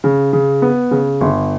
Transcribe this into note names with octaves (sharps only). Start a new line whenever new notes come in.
C#3
C#3
B3
C#3
G1